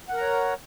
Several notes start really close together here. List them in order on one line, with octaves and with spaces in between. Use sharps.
F#5 A#4 A#5 C#5